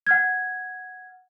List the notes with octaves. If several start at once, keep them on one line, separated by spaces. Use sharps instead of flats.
F#5 F6 G#6